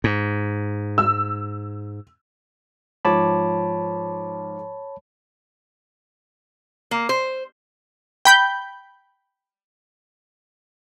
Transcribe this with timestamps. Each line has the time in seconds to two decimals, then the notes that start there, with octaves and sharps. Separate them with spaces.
0.04 G#2
0.98 E6
3.05 G#2 F3 C#5 A5 B5 D6
6.91 A#3
7.09 C5
8.25 G5 B5 G6